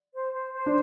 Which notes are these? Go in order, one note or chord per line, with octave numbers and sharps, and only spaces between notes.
C5
C5
C5
D4